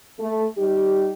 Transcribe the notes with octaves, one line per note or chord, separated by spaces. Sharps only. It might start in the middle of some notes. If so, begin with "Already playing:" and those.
A3
G3 D#4 G4